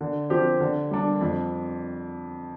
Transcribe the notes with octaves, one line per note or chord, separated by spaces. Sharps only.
D3
F3 C4 G4
D3
G3 D4
F2